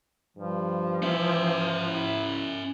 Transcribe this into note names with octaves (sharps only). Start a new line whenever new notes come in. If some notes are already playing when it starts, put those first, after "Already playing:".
G2 F3
E3 C#4 E5
E4